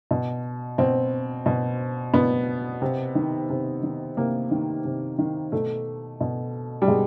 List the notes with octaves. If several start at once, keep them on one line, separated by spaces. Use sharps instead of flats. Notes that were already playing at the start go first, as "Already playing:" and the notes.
B2
B2 C4
B2
B2 B3
C3
D#3
C3
D#3
C3 A#3
D#3
C3
D#3
B2 A3
B2
G3
B2 G#3